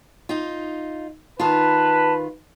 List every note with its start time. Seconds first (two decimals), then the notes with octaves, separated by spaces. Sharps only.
0.29 D#4 F4
1.40 D#3 F4 B4 A5